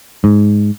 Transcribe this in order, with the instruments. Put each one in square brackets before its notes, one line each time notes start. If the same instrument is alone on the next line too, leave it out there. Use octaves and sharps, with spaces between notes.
[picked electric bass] G#2